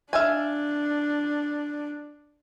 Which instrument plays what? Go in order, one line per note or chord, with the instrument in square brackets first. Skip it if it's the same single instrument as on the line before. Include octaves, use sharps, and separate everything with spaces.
[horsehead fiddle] D4 [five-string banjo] E5 F5 G#5